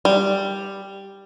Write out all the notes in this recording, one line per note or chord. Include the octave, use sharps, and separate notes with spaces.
G3